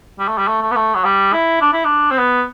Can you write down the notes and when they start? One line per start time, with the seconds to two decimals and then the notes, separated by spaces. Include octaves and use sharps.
0.19 G3
0.28 A3
0.38 G3
0.48 A3
0.61 A3
0.71 B3
0.76 A3
0.95 F#3
1.04 G3
1.33 E4
1.61 D4
1.73 E4
1.85 D4
2.11 C4
2.17 B3